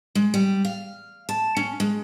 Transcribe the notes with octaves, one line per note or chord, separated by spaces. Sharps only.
G#3
G3
F5
A5
C#4
G#3